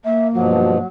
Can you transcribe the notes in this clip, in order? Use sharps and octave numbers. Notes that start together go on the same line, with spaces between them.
A#3 E5
G2 B2 F3 F#3